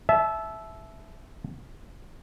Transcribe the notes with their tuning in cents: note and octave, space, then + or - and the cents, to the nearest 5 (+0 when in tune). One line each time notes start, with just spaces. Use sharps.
E5 +0 A5 -30